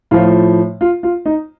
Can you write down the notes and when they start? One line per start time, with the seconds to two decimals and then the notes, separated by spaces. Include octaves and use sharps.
0.11 A2 F3 F4
0.81 F4
1.03 F4
1.26 D#4